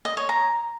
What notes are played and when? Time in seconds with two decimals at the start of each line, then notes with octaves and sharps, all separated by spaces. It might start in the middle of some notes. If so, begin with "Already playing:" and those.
0.05 D#5
0.17 C#5
0.29 A#5